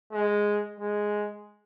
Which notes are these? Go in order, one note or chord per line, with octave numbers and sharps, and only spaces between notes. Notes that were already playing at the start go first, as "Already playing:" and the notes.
G#3
G#3